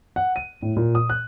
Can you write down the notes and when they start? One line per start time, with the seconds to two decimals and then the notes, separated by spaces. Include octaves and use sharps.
0.16 F#5
0.36 D#7
0.62 A2
0.76 A#2
0.95 D#6
1.09 F#6